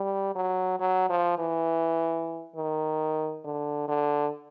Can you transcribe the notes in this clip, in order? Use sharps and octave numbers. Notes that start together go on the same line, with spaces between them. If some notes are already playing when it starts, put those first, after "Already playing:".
Already playing: G3
F#3
F#3
F3
E3
D#3
D3
D3